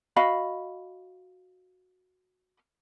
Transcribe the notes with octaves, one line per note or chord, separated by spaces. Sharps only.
F#4 D#5 F5 B5